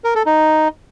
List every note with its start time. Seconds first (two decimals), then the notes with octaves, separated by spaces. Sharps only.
0.04 A#4
0.15 A4
0.26 D#4